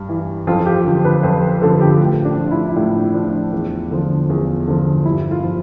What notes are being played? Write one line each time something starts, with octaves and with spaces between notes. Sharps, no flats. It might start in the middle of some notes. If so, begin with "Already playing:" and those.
Already playing: G2
E3
F2 F4
G4
D3 F3
B4
F2 C5
B4
D3 F3 A4
G4
A2
D4
F3
F4
E4
E4
A2 D4
F3 D4
E2
D3 F3
E2
D3 F3
G2 E4
F4
F3